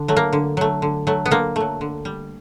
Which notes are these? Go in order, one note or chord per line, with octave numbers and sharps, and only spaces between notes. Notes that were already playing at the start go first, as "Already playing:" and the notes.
Already playing: D3
F#3 A3
A#3
D3
F#3 A3
D3
F#3 A3
B3
D3 A#3
F#3 A3
D3
G3